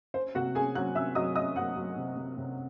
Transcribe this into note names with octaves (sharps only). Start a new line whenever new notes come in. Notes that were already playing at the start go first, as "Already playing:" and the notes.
C#4 C5
C3 F#4 F#5
C#4 G#4 G#5
F#3 F#5 F#6
C3 E5 E6
F#3 D#5 D#6
C#4 D#5 D#6
F#3 F#5 F#6
F#3
C3
C3
C3